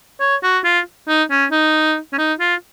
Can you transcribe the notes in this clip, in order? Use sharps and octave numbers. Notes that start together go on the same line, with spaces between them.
C#5
F#4
F4
D#4
C#4
D#4
C#4
D#4
F4